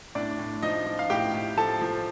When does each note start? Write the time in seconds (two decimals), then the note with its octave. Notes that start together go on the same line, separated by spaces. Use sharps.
0.15 A2 D4 D5
0.39 A2
0.62 F3 D#4 D#5
0.86 F3
0.99 F5
1.10 A2 G4 G5
1.34 A2
1.57 F3 A4 A5
1.81 F3